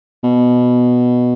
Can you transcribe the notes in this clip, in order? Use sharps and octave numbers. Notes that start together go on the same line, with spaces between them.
B2